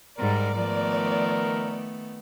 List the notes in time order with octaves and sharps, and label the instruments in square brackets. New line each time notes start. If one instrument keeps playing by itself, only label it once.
[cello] G#2 G3 [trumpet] A#4 [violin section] D5
[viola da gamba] D#3 A3 B3 [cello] F3 [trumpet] A#4